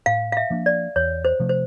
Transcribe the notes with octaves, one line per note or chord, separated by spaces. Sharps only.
A2 F5
F5
E5
F3 A#3 D4
D5
E2 C#5
C5
C3 F3 A3
C5